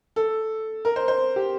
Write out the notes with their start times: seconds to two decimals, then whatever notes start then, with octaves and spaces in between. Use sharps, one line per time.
0.16 A4
0.85 A#4
0.96 C5
1.08 C5
1.36 G4